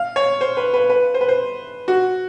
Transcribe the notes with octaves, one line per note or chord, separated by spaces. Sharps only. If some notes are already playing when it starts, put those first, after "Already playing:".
Already playing: F5
C#5
C5
B4
B4
B4
C5
B4
C5
F#4